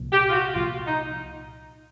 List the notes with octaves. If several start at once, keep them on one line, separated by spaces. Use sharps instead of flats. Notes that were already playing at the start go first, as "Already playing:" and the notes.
Already playing: C2 A#2 F3
G4
F4
F#4
C2 A#2 F3 F4
D#4